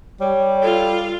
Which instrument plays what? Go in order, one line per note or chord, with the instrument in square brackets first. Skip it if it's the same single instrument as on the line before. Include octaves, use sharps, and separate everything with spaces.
[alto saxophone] G3 [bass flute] C#5
[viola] F4 [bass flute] A4